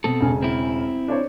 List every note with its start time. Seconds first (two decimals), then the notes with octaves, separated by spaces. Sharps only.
0.04 B2 C4 A4
0.21 E1 C#3 G#5
0.43 C4 E4
1.08 D4 C5 C#5